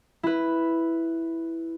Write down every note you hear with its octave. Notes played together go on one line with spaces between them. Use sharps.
E4 B4